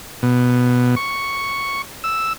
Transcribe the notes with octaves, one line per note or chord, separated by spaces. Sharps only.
B2
C#6
E6